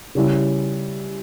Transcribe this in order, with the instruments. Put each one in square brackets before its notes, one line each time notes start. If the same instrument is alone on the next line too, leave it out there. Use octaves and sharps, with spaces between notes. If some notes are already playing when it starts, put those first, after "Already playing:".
[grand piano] C#3 G3 C#4 E4